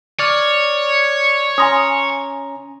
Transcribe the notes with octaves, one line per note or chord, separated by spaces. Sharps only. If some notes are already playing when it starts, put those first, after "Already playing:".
C#5 D5 F6
C#4 G#5 A#5 C6 D#6